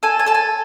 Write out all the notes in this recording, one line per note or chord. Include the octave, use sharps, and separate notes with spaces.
A4 G#5
G#5
A4 A5
G#5